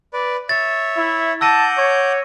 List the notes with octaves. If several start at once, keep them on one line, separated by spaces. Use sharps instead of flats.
B4 D5
C#5 E5 A6
E4
F#5 A5 D6 E6 G6 A#6 D#7
C#5